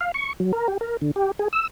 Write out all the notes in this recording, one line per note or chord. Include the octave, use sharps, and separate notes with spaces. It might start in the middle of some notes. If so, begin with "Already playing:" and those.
F5
C#6
F#3
A#4
G4
A#4
D3
G4
G#4
E6